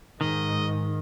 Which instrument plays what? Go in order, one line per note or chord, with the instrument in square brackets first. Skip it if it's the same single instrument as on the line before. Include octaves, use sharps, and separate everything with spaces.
[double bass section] G#2 [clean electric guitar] D#3 [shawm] D#5